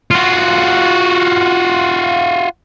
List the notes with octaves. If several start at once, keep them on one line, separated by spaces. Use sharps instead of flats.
F4 F#4